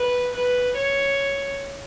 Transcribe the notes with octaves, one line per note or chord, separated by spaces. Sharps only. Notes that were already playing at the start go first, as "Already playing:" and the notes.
Already playing: B4
B4
C#5